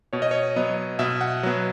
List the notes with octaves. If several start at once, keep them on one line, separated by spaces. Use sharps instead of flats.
B2 C#5
D#5
C#5
F#3 B3 D#5
B2 E5
F#5
F#3 B3